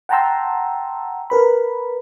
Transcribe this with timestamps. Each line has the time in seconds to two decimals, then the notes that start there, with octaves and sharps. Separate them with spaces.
0.09 F#5 G5 A5 A#5 C6 E6
1.30 A#4 B4 B5